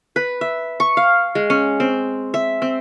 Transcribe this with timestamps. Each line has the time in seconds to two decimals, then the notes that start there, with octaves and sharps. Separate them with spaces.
0.16 B4
0.41 E5
0.80 C#6
0.97 F5
1.35 G#3
1.50 C#4
1.80 C4
2.34 E5
2.62 C4